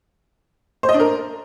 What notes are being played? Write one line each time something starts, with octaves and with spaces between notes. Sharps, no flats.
C5
D#5
D4
A#4